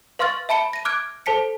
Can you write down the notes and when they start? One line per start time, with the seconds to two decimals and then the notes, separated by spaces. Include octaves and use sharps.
0.19 B4 F5 C6 C#6 F6 A6
0.49 E5 A5 B5 C#7 G7
0.73 A#6 D#7
0.85 D6 F6 F#6 G#6 D7
1.26 A4 C5 A5 B6 C#7